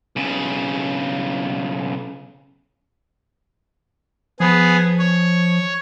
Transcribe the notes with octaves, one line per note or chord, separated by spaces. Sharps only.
B1 C#3
F3 B3 G#4
C#5